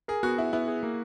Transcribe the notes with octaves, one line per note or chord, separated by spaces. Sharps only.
G#4 A#4
B3 F#4
E4 F#4
B3 E4
G#4
A#3